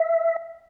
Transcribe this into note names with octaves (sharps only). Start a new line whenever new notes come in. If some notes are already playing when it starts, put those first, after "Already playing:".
Already playing: E5